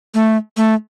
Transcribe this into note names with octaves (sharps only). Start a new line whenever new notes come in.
A3
A3